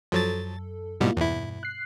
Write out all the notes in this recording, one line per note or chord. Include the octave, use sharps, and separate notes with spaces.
F#2 F3 F#3 A4 A6
G#2 B2 G3 A#3 E4 F4
E2 G2 B2 E4
F#6 C7